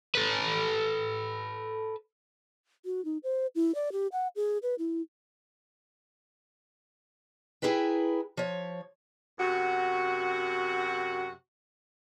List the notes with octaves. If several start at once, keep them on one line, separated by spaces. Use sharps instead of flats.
A4 B4
F#4
D#4
C5
E4
D5
G4
F#5
G#4
B4
E4
E4 G#4 A#4 B4 G5
F3 C#5
F#2 C3 F#4